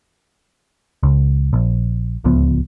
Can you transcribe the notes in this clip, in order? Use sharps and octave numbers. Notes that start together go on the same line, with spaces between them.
C#2
A#1
D1 C#2 F3 B3